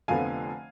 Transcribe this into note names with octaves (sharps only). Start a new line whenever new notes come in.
F1 F2 D3 F3 B3 F5 G#5